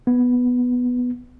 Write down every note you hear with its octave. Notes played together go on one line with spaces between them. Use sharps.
B3